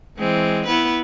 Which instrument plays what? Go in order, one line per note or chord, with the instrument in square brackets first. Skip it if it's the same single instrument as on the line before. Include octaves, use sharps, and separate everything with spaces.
[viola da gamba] E3 G#3 C4
B3 E4 B4